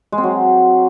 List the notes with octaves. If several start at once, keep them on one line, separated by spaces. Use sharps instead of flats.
G#3
C4
F#3